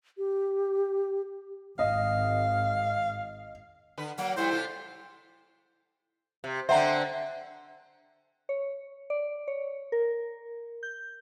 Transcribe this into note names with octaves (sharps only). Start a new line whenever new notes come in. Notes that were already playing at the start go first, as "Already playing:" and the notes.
G4
G#1 D#5 F5
D3 B4
F#3 A#3 F#5
F3 G3 A3 E4 C5
C3 F4 A4
C3
D3 C4 C5 E5 F#5 A#5
C#5
D5
C#5
A#4
G6